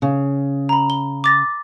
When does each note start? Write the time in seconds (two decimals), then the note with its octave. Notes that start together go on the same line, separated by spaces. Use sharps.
0.02 C#3
0.69 A#5 B5
0.90 G7
1.24 D6 A6 A#6